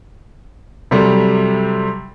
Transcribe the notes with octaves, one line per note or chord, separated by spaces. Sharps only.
C3 F#3 G3 A3